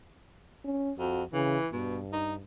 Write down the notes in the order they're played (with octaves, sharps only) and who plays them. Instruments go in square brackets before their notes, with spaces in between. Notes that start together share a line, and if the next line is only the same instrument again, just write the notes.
[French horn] C#4
[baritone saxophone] F2 [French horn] F#4
[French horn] C#3 [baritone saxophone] E3
[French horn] G2 [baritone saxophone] B2
[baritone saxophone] D#4